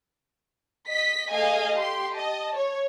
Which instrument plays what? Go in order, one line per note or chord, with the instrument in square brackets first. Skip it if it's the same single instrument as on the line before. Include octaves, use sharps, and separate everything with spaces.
[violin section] D#5 B6
A3 G#4 D#5 F5 G#5
G4 C6
D#5 A5
C#5